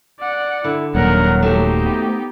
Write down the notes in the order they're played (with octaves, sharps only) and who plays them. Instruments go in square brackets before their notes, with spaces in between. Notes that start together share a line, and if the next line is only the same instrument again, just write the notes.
[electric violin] D5 F#5
[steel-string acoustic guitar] D3 [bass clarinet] E4
[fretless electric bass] D#1 [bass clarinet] F#3 [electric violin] A#4 F#5
[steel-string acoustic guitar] A3 F#4 C5 [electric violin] D#4 G4
[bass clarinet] B3